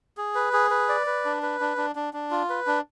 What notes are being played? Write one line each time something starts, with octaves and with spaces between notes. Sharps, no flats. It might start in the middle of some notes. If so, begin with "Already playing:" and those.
G#4
B4
G#4
B4
D5
B4
D4
B4
D4
D4
D4
D4
F4
B4
D4